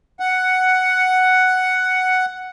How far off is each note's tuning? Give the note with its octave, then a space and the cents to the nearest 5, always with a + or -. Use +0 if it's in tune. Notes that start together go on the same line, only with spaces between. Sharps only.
F#5 +5